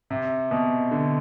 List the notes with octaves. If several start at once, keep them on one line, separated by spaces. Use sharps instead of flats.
C3
B2
D3